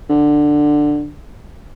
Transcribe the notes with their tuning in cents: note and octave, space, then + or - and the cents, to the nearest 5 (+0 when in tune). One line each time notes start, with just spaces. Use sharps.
D3 +10